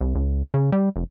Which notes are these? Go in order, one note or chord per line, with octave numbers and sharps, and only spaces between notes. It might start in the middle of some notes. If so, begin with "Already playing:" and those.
C2
C#2
C#3
G3
F1